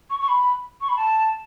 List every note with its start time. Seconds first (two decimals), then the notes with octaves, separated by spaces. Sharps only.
0.10 C#6
0.21 C#6
0.28 B5
0.81 C#6
0.89 B5
0.96 A5